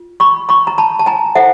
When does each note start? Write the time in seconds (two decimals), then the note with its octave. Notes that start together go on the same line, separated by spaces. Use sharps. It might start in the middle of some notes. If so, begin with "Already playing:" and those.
Already playing: F4
0.20 B5 C#6
0.49 B5 C#6
0.67 A#5
0.78 A5 B5
0.99 A5
1.06 G#5 A#5
1.35 E4 A4 C5 E5 F#5